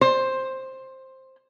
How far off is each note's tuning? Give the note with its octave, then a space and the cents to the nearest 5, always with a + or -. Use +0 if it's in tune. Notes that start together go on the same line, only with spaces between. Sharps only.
C5 +10